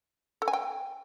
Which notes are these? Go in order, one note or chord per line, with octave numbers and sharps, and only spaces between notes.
A4
G#5
G5